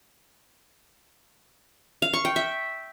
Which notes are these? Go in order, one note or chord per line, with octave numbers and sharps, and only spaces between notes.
F5
C#6
G5
E5